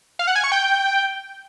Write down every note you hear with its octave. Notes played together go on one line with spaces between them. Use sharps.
F5
F#5
G#5
C#6
G5